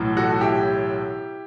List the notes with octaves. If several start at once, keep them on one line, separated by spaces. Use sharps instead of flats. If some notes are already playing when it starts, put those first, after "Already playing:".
Already playing: B1 A2 E3
F#4 A4
E4 G4